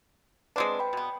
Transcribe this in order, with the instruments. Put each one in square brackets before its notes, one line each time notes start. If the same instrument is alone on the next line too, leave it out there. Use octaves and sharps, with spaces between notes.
[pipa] G#3 C4 D4 [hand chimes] B4
[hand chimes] G5 B5
[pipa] B2 B3